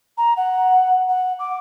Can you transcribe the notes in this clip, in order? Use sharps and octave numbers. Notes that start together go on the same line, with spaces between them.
A#5
F#5
F#5
D6